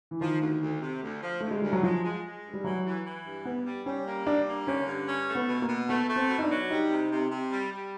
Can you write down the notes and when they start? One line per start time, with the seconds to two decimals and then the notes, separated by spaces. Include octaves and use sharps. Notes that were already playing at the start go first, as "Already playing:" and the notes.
0.11 E3
0.21 D#3 F3
0.41 D2
0.62 D2
0.82 C3
1.02 D2
1.22 F3
1.41 D2 A3
1.51 G#3
1.62 D2 G3
1.73 F#3
1.83 F3 G#3
2.03 G#3
2.24 G#3
2.44 G2
2.53 G3
2.64 E3 F#3
2.85 E3
3.05 E3
3.26 G2
3.45 G3 B3
3.66 G3
3.86 G3 C#4
4.06 A#3
4.26 G3 D4
4.47 A#3
4.67 D3 C#4
4.87 G2
5.07 C#4
5.28 A3
5.35 B3
5.48 B2
5.62 A#3
5.69 B2
5.89 A3 B3
6.09 A3
6.16 C4
6.29 B2
6.38 D#4
6.43 D4
6.50 F#3
6.70 G3 D#4
6.90 C3
7.11 C3
7.31 C3
7.51 G3
7.71 G3